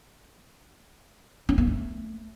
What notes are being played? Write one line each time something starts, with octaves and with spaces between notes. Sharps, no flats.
C#4
A#3
A3